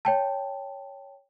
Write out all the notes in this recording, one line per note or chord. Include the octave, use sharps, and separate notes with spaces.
C#5 G5 A5